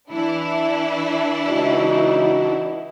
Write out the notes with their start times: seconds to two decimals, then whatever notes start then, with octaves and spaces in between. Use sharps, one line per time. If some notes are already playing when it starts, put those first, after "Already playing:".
0.10 E3 D4 E4
1.46 C#2 D#4 F#4